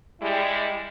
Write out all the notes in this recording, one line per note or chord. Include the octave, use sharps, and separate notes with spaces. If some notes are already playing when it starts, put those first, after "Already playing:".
G3 G#3 E4